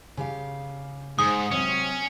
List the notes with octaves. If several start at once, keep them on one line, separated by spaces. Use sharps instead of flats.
C#3 G4 F5
G#2 G#4 C5 D#6
C3 F#3 C#4